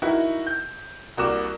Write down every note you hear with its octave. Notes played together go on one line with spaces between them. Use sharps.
D#4 E4 F#4 A#4 E5
G6
C2 A#3 F#4 A#4 D6 E7